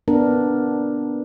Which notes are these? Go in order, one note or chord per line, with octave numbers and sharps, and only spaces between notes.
B3 D4 A#4